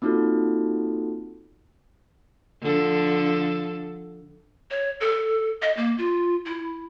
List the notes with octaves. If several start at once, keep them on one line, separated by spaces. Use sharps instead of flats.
A#3 C4 D#4 F4 F#4 A4
D3 F3 A4
C#5
A4
D#5
A#3
F4
E4